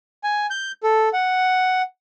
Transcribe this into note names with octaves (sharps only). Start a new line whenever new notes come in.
G#5
G6
A4
F#5